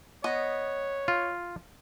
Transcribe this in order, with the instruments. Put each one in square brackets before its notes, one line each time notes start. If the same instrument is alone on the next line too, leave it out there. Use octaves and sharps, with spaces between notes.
[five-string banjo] B3 D#5 [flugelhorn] C#5
[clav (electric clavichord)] F4